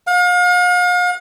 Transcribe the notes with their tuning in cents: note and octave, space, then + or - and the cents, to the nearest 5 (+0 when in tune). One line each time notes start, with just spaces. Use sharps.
F5 +40